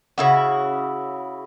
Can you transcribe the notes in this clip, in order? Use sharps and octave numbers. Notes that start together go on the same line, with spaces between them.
C#3 E4 F#4